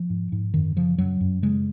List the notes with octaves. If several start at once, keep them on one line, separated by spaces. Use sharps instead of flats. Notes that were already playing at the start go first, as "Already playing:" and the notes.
Already playing: F3
G#2
G#2
F#2 D#3
C#3 F3
F#2 F#3
F#2
C#3 G#3